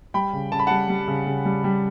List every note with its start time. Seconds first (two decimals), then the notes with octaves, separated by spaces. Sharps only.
0.14 G3 G5 B5
0.33 C#3
0.52 C#3 A5
0.59 B5
0.67 G3 F#5 A5
0.89 G3
1.08 C#3
1.26 C#3
1.45 G3
1.64 G3